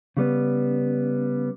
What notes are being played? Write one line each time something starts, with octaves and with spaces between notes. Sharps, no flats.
C#3 G3 B3